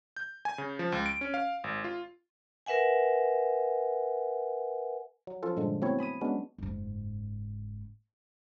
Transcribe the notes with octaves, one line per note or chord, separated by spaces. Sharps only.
G6
G#5
C#3
F3
C#2
D7
C#4
F5
G#1
F4
A#4 B4 E5 F#5 G#5
F#3
F3 C#4 F4 A4
G2 A#2 D3 F3 G#3
F#3 A3 B3 C4 E4 C#5
G#5 B5 D#6 D#7
F#3 G#3 B3 C#4 D4
F#1 G#2